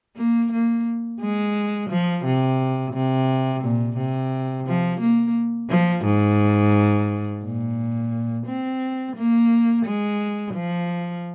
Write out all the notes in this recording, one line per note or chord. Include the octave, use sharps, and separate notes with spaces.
A#3
A#3
G#3
F3
C3
C3
A#2
C3
F3
A#3
F3
G#2
A#2
C4
A#3
G#3
F3